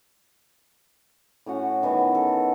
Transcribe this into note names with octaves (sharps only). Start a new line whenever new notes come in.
A2 C#4 F#4 F#5
D#3 E3 B3
A4